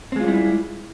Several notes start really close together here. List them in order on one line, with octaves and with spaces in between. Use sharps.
C4 G#3 F4 G3 E4